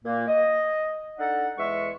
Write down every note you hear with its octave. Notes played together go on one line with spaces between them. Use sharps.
A#2 A#3
D#5
D4 D#4 A4 F#5
E2 G#3 E5 C#6